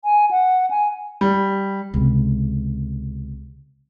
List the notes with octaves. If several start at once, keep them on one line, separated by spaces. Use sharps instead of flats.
G#5
F#5
G#5
G3
C#2 C3